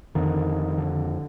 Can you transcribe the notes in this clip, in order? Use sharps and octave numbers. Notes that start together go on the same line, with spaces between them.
F2 D3 D#3
D3